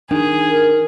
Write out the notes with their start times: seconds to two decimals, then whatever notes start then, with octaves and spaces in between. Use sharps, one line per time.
0.11 D#3 D4 G#4
0.49 A#4